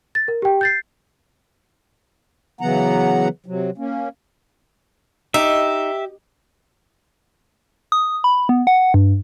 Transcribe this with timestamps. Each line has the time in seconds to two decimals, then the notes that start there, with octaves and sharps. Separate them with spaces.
0.15 A6
0.28 A#4
0.42 G4 G5
0.61 G6 A6 C7
2.61 C#3 E3 F#3 B3 F#5 A#5
3.46 C3 F#3
3.78 A#3 C#4
5.34 D#4 G4 E5
7.92 D#6
8.24 B5
8.49 B3
8.67 F#5
8.94 G2